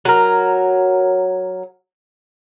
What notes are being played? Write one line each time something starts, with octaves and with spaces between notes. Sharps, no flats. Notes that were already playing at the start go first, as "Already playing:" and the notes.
F#3 A#4